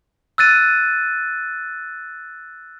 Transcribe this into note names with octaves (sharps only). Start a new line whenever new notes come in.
E6 F#6 A6 D#7